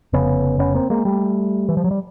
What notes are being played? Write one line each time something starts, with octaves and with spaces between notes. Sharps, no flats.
F1 F2 C#3 B3 C#4
B3 C#4
A#3 C4
G#3 A#3
G3 A3
E3
F3
F#3
G3